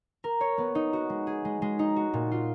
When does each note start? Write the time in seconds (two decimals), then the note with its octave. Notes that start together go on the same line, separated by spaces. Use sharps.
0.24 A#4
0.41 C#5
0.58 B3
0.75 D#4
0.93 F#4
1.10 G#3
1.27 G#4
1.45 G#3
1.62 G#3
1.79 D#4
1.96 F#4
2.13 A#2
2.32 F4